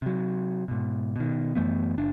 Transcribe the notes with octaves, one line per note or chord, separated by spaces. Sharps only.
C3 F#3
G#2 B2
B2 D#3
F#2 E3 A3 B3
F#1 D4